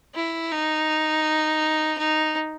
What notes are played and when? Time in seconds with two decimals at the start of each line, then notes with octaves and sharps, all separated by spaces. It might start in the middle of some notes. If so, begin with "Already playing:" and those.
0.15 E4
0.52 D#4
1.98 D#4